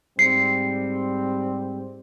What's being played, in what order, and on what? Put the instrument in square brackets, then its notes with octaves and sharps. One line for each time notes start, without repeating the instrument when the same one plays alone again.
[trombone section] G#2 G3 C4 [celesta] C7 C#7